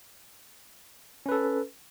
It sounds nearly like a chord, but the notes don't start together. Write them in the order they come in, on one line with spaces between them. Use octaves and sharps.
C#4 B4 A4